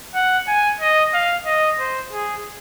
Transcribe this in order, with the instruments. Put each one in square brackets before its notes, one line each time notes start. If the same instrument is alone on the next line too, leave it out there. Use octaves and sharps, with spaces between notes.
[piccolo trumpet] F#5
G#5
D#5
F5
D#5
C5
G#4